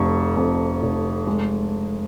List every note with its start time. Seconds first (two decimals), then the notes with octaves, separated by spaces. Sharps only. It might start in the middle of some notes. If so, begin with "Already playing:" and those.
Already playing: F1 F2 C#6
0.37 F2
0.83 F1
1.27 G#3